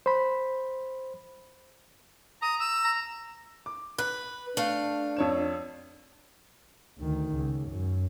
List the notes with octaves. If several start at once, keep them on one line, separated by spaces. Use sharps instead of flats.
C5 B5
A#5 D#6
E6
A#5
D6
B4 F#6
A3 D4 F5
F2 C#5 E7
D2 D#3
C#2
F#2